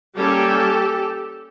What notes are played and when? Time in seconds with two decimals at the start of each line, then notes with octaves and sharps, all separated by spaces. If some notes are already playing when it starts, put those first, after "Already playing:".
0.17 G3 A#3 C#4 G4 A4